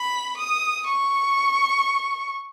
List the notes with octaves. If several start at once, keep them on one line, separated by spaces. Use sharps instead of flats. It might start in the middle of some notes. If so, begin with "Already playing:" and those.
Already playing: B5
D#6
C#6